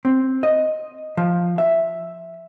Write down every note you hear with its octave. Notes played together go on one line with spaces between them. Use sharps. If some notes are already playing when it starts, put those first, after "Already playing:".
C4
D#5
F3
E5